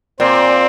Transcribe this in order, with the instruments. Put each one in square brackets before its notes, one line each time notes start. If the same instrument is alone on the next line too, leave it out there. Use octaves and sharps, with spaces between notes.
[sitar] A#2 [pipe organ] C4